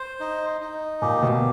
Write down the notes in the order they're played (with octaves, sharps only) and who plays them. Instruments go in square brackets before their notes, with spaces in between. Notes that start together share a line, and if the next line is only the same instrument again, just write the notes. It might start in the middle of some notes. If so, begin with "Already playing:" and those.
Already playing: [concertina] C5
D#4
D#4
[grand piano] A#2 [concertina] G4
[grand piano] B2